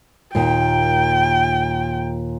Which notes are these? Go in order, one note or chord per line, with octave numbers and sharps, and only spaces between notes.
D#2 A#2 G5